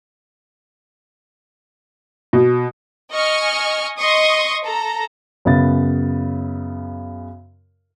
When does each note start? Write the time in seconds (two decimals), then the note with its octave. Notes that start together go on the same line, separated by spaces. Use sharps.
2.33 B2
3.11 D#5 G#5 C#6 F6
3.96 D#5 C6 C#6 D#6
4.63 A4 A#5
5.45 F#2 C#3 B3 A6